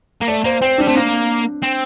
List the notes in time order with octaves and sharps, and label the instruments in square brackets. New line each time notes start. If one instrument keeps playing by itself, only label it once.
[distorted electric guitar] A#3
[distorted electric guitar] A3 [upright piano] D5
[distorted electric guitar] A#3 [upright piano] C5
[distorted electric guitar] C4 [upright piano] C5
[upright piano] D4
[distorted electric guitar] G3
[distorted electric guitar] A3 [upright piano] C4
[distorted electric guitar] A#3 [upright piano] D4
[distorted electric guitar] C4